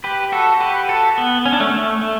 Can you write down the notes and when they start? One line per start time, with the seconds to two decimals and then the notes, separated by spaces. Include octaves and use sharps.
0.04 G4 B4
0.32 F#4 A4
0.61 G4 B4
0.89 F#4 A4
1.18 B3
1.45 C#4
1.53 D4
1.60 A3 C#4
1.73 A3
2.01 A3